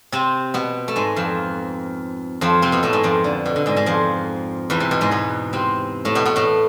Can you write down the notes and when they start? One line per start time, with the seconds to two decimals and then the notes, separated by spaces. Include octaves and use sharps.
0.12 C3 C4
0.54 B2 B3
0.88 A3
0.96 G#2 G#3
1.16 F2 F3
2.41 F2 F3
2.62 C3 C4
2.72 B2 B3
2.83 A2 A3
2.93 G#2 G#3
3.03 F2 F3
3.24 D3
3.46 B2
3.56 D3
3.66 G#2 G#3
3.76 G#2 G#3
3.86 F2 F3
4.70 E2 E3
4.80 C3
4.91 B2
5.01 G#2 G#3
5.11 B2 B3
5.53 C3 C4
6.05 A2 A3
6.15 B2 B3
6.25 B2 B3
6.36 A2 A3